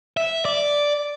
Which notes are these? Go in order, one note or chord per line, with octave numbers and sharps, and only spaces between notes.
E5
D5